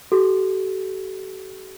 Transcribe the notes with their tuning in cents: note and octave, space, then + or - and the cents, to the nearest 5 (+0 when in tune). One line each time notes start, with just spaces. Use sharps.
F#4 +40 A4 -45